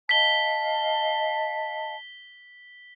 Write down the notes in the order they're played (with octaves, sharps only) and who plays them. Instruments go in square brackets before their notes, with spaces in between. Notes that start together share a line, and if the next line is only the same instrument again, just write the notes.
[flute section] D#5 F5 A5 [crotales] B6 G7